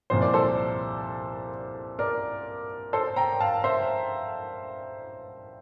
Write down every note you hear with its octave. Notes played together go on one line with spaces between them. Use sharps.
C2 A#2 F3 C5
D5
A4 C5
A#4 D5
A4 C5
G5 A#5
F5 A5
C5 E5